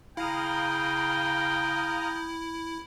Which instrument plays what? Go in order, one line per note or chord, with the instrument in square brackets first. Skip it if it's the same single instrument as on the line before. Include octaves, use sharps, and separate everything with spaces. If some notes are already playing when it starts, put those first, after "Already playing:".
[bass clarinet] C#3 [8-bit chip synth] E4 [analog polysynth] F5 A#5 D#6 [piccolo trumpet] G5